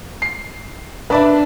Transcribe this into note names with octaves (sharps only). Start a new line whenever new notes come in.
C7
D4 B4 D5 E5